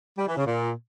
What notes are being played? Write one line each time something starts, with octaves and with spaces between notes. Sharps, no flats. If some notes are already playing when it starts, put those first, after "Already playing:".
G3
E3
C#3
A#2